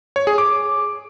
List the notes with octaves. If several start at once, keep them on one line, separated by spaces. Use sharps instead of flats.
C#5
G#4
D6